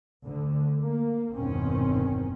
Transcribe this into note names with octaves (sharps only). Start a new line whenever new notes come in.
D2 D3
A#3
G1 E2 B2 D#3 C4 C#4